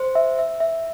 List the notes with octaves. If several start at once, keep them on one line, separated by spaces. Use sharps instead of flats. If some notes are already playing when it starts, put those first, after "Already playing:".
Already playing: C5
E5
E5
E5